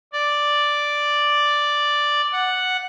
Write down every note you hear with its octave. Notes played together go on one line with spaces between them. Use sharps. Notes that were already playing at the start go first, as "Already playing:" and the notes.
D5
F#5